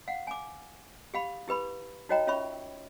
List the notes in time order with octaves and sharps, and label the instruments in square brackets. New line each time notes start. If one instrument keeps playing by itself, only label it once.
[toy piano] F5 F#5
G#5 D6
G4 F5 B5
E4 G4 B4 B5
D#4 F#4 C#5 D#5 G5 A#5
C#4 F4 C#5 E5 B5 C#6